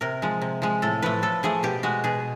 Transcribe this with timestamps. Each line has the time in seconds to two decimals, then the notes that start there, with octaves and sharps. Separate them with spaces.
0.01 C3 A#4
0.22 F3 G#3
0.42 C3
0.62 F3 G#3
0.82 A2 A4
1.02 F3 A3 B4
1.22 A2 A4
1.43 F3 A3 G#4
1.63 B2 G4
1.83 G#3 F#4
2.04 B2 G#4